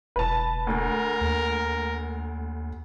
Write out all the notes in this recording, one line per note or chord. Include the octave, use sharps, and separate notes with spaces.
E1 B4 A5
D2 A#4
D#2